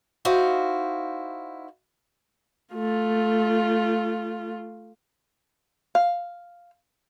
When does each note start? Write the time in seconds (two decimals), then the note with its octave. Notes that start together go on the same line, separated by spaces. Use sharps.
0.25 D#4 E4 F#4 C5 F5
2.74 A3 F4
5.95 F5